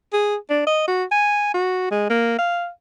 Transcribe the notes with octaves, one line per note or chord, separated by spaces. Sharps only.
G#4
D4
D#5
F#4
G#5
F#4
G#3
A#3
F5